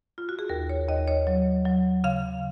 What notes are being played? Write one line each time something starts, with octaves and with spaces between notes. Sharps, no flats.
F4
F#4
G#4
D#2 A#4
C#5
D#2 D#5
C#5
F#3
F#3
C#3 F5